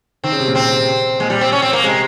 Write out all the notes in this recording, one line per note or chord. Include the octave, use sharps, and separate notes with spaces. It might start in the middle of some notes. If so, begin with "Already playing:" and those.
D#3 C4
C#3
C3
A#2
C3 C4
A#2 G#3
G3
C4
C#4
C4
A#3
C3 G#3